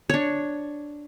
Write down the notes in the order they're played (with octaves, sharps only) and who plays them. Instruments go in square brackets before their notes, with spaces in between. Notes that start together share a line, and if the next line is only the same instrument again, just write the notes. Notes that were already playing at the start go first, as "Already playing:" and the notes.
[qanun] D4 C#5